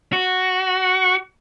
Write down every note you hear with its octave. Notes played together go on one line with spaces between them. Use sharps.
F#4